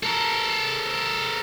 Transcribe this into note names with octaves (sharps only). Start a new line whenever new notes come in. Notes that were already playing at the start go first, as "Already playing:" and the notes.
A4 A#4